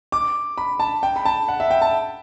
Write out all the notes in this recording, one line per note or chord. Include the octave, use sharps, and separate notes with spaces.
D6
B5
A5
G5
B5
A5
F#5
E5
G5
A5